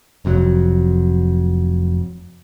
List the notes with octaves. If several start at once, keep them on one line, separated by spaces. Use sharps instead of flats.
F1 F2 A2 F#3